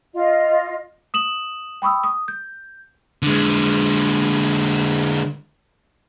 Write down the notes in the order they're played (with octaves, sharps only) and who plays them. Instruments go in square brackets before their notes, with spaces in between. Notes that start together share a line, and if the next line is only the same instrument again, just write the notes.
[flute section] F4 D#5
[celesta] D#6 E7 F#7
G5 B5 C#6 D#6 E6
D#6
G6
[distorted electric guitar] D3 G#3